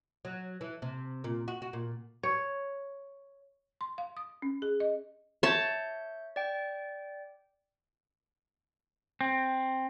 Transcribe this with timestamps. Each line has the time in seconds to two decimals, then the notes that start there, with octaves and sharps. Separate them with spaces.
0.25 F#3
0.61 E3
0.82 C3
1.24 A#2
1.48 F#4
1.62 F#4
1.73 A#2
2.23 C#5
3.81 C6
3.98 F5
4.17 D#6
4.42 C#4
4.62 G#4
4.80 D#5
5.43 C#5 E5 A5 G6
6.36 D5 G5
9.21 C4